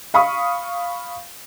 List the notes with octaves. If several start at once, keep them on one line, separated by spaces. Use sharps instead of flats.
F5 B5 C#6 D#6